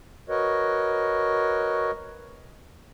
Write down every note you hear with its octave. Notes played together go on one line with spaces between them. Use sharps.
F#4 A#4 B4 C#5 D#5